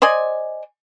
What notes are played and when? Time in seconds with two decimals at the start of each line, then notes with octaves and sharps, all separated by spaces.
0.02 C5 D5 D#5 G#5